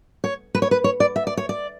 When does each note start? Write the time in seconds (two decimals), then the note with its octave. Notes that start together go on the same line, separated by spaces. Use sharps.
0.24 C#5
0.55 B4
0.62 C#5
0.71 B4
0.84 C#5
1.00 D5
1.16 E5
1.27 D5
1.37 C#5
1.49 D5